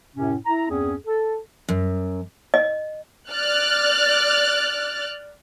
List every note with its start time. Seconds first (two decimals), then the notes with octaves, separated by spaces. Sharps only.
0.16 F#2 A2 C3 C#4
0.46 E4 A#5
0.69 E2 G2 C4 C#4 G#4
1.06 A4
1.69 F#2
2.54 D#5
3.31 D5 F6 F#6 A6